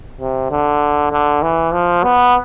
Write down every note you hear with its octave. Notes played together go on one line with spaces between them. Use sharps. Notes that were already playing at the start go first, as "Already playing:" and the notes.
C3
D3
D3
E3
F3
B3